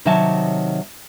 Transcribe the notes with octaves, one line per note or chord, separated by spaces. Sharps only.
C3 D#3 F#3 C#5 E5 A5